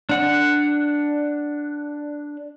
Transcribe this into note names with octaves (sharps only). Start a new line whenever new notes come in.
D4 F#5